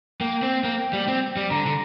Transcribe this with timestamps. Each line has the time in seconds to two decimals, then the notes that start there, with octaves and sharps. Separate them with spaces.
0.21 A#3 G5
0.43 C4
0.64 A#3
0.93 G3
1.08 C4
1.37 G3
1.51 D3 A#5
1.66 D3